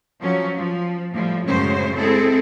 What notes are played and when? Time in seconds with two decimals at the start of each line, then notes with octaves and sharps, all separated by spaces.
0.20 F3 F#3 C#4
0.56 F3
1.13 A2 F3 G3
1.46 F#2 A2 C#3 G#3 C#4 C5
1.96 G#3 C4 E4 G#4 A4